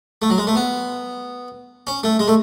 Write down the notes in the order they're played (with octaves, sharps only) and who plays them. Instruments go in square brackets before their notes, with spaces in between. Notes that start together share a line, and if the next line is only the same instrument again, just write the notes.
[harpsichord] A3
F#3
G#3
A3
B3
C#4
A3
G#3
A3